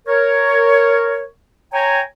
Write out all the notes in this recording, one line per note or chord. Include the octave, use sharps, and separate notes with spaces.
A#4 C#5
C#5 G5 G#5 A#5